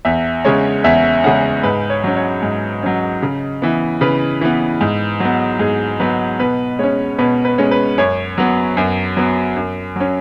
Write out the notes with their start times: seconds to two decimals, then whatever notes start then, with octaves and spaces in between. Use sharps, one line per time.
0.05 E2 E5
0.45 C#3 G#3 C#4 C#5
0.84 E2 E5
1.24 C#3 G#3 C#4 F#5
1.63 G#2 B4
1.90 C#5
2.04 F#3 C#4
2.16 C#5
2.43 G#2
2.83 F#3 C#4
3.22 C#3
3.62 E3 B3
4.01 C#3 B4
4.41 E3 B3
4.81 G#2
5.20 F#3 B3
5.59 G#2 G#4
6.00 F#3 B3 B4
6.39 B2 B4
6.79 G#3 C#4 C#5
7.18 B2 B4
7.45 B4
7.58 G#3 C#4
7.71 B4
7.98 F#2 C#5
8.38 F#3 B3
8.77 F#2
9.17 F#3 B3
9.56 F#2
9.96 F#3 C#4